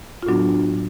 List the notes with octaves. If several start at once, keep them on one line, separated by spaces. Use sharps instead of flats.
F4
A2 F#3 B3 D4 F#4